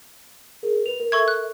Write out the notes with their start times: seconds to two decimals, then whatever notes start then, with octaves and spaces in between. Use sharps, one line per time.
0.63 G#4 A#4
0.86 B4 F7
1.00 A#4
1.12 A4 E5 C#6 G#6
1.28 F#6